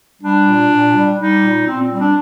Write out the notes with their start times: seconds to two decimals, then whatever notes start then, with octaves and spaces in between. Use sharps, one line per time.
0.22 G3 D4
0.46 A#2
0.70 A#2
0.94 G3
1.18 G3 D#4
1.42 A#2
1.66 A#2 C4
1.82 C4
1.90 G3
1.98 D4